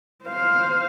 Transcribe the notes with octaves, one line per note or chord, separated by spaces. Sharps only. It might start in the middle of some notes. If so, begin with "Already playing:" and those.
C5 F5